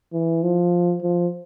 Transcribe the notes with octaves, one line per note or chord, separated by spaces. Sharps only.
E3
F3
F3